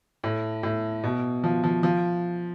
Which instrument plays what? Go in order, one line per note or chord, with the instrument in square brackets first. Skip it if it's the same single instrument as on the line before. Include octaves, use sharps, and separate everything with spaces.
[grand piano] A2
A2
B2
F3
F3
F3